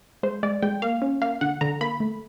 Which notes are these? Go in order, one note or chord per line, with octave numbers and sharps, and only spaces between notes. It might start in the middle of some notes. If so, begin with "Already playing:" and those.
G#3 C5
G#3 D5
G#3 G5
A#3 F5
C#4
A#3 F5
D3 F#5
D3 A#5
A#3 B5
A3